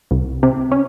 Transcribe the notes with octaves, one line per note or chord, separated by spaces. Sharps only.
C2
C3
C#4